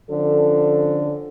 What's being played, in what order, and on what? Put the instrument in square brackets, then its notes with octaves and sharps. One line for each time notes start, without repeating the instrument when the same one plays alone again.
[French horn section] D3 F3 C#4 A4